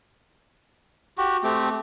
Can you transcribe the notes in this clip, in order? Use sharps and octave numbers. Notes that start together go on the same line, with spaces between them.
F#4 G4
A3 C4 G4